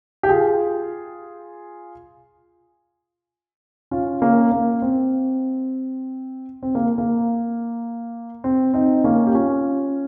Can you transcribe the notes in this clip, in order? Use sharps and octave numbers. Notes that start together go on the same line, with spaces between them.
G4
F4 G#4
C#4 F4
A#3 C#4
A#3
C4
C4
A#3
A#3
C4
C4 D#4
A#3 C#4
G4
C#4 F4